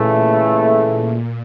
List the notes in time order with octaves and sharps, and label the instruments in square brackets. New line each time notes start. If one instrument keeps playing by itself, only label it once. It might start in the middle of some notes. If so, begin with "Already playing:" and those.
Already playing: [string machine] A#2 [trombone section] C#3 E3 A3